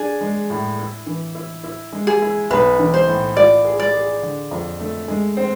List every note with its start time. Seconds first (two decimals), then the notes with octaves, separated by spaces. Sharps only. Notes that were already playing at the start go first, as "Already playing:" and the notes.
Already playing: D4 G#4
0.21 G#3
0.50 A2
0.78 E4
1.06 E3
1.35 E4
1.64 E4
1.93 G#3
2.07 G#4
2.22 E4
2.50 B1 B4
2.79 E3
2.94 C5
3.07 A2
3.37 F4 D5
3.65 G#4
3.80 D5
3.94 G#4
4.22 D3
4.51 F2
4.80 A3
5.08 G#3
5.37 C4